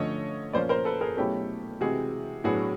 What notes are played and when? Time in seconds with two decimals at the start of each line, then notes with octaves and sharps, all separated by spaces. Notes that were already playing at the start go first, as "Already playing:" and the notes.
Already playing: D3 F3 A3 C#4 C#5 D#5
0.53 A#2 F3 A#3 C#4 C5 D5
0.69 A#4 C5
0.85 A4 B4
1.01 G#4 A#4
1.17 B2 F#3 A3 C#4 E4 G4 A4
1.81 C3 E3 G#3 C4 F#4 G#4
2.44 A2 F#3 B3 D4 F#4 G#4